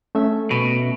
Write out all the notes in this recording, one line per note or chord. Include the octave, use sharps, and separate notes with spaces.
A3 C#4 E5
B2